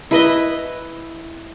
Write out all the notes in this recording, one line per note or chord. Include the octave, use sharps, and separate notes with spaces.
E4 B4 D#5 E5